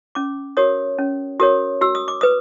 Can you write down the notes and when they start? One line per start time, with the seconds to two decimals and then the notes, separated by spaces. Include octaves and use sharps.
0.15 C#4 D6
0.57 F#4 A#4 C#5 D#6
0.99 C#4
1.40 F#4 A#4 C#5 D#6
1.81 F#4 E6
1.95 D#6
2.08 D6
2.21 B4 D#6